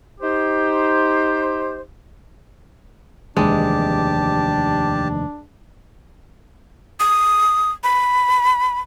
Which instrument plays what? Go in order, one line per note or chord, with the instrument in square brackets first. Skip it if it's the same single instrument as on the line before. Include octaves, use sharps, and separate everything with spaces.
[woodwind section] D#4 G4 C5
[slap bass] F1 D#2 E3 [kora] G#3 [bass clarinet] D4 [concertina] G4 A5
[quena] D#6
B5